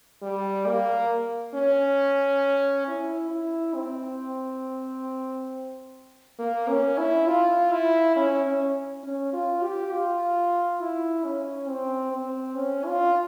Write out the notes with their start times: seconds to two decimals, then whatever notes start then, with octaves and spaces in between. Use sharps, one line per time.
0.22 G3
0.67 A#3
1.54 C#4
2.87 E4
3.31 E4
3.75 C4
6.39 A#3
6.69 C#4
6.98 E4
7.28 F4
7.72 E4
8.16 C#4
8.45 C#4
9.03 C#4
9.33 F4
9.63 G4
9.92 F4
10.80 E4
11.24 C#4
11.69 C4
12.12 C4
12.56 C#4
12.86 F4